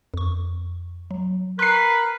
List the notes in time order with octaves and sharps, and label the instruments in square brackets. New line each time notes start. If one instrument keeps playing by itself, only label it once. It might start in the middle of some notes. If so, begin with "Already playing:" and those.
[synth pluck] F2 C#6
F#3
[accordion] A#4 [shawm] B4 [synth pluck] C6 [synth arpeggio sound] F#6 C7